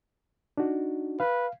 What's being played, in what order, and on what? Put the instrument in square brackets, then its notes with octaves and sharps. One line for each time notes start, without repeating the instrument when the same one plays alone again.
[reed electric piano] D4 D#4 F#4
[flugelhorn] B4 [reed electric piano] F5